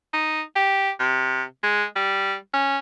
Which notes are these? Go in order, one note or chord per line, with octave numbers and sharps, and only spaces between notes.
D#4
G4
C3
G#3
G3
C#4